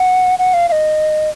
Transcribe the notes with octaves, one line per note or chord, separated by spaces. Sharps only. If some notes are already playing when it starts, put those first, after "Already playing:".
Already playing: F#5
F#5
F5
F5
D#5